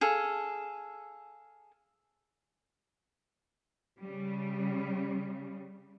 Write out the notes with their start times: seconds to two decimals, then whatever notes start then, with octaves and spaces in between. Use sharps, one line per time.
0.01 G#4 A4 F5
3.98 C#3 G3